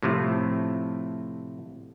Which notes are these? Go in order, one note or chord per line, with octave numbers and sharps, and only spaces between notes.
A2 C3 F3 A3